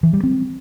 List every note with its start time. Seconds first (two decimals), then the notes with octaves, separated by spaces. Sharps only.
0.03 E3
0.13 G3
0.23 C4